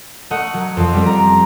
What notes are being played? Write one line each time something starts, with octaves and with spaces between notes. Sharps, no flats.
A3 D#5 F#5 C#6
F#3
F2 F3
G3 C4
A#5